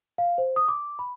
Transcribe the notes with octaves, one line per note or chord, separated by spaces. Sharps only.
F5
C5
D#6
D6
B5